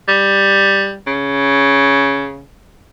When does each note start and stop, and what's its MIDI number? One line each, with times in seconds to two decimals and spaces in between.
0.08 0.96 55
1.07 2.44 49